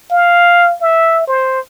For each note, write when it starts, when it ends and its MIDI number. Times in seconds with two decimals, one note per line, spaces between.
0.10 0.75 77
0.81 1.26 76
1.27 1.60 72